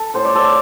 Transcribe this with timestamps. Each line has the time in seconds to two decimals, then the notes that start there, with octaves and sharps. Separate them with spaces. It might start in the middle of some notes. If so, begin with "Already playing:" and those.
Already playing: A4
0.14 A2 C5
0.25 D5
0.35 A4 C5